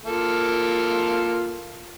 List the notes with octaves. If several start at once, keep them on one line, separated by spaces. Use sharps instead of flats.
A#3 F4 A4